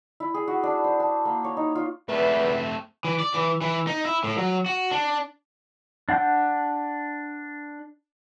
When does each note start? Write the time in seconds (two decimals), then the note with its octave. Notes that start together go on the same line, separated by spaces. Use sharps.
0.20 E4
0.34 G#4
0.48 F#4
0.63 D4
0.84 C5
1.00 A5
1.25 A#3
1.44 C#5
1.57 D#4
1.75 F4
2.09 E2 A3 C4 B4 E5
3.05 E3
3.20 D5
3.34 E3
3.61 E3
3.87 D#4
4.05 E4
4.24 A2
4.38 F#3
4.66 F#4
4.91 D4
6.09 D4 F#5 G6